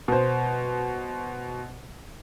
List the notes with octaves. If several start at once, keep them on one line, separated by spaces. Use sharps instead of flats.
B2 C5